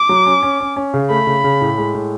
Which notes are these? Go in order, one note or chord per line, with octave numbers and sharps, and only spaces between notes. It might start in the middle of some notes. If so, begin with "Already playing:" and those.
Already playing: D6
F#3
C#4
C#4
C#4
C#4
C#3
A3 B5
C#3
C#3
A2
G#3
A2